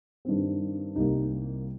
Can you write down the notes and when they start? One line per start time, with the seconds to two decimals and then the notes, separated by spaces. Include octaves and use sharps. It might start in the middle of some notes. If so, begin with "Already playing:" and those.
0.25 G2 D#3 G3 C4
0.96 C2 C3 G3 A#3 D#4